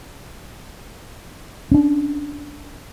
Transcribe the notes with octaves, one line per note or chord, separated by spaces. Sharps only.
C#4 D4